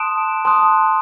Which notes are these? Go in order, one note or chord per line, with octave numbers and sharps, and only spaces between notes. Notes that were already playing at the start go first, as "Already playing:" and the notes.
Already playing: A5 C6 D#6 F#6 D7 E7
A5 C6 D#6 F#6